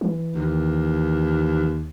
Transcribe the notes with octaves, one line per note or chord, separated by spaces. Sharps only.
E3
D#2